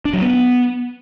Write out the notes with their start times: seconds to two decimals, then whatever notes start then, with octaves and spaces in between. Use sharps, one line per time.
0.05 D4
0.14 F#3
0.22 B3